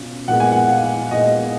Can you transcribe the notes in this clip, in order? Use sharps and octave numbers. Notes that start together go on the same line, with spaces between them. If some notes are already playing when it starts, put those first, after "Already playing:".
Already playing: B2 C#4 F4
A#2 G#3 B3 F#5
G#5
F#5
F5
A#2 G#3 B3 D#5